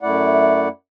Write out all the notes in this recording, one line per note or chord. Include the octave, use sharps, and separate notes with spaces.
F#2 A3 E4 D5 F#5